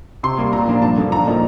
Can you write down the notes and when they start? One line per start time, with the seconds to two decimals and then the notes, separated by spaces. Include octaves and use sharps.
0.23 C3 C6
0.38 G3 A#3
0.53 A#2 A#5
0.68 F3 A#3 D4
0.82 G2 A5
0.97 D3 F3 A#3
1.12 A#2 A#5
1.27 F3 A#3 D#4